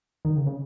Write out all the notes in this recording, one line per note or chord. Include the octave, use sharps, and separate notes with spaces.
D#3
C#3
C#3